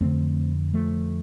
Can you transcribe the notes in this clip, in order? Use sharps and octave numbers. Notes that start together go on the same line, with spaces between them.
F2 D3 A3 C4
F3 A3